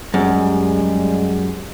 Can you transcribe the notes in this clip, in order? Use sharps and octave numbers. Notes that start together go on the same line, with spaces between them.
F#2 G3 G#3